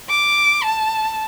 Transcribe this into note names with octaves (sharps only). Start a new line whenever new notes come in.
D6
A5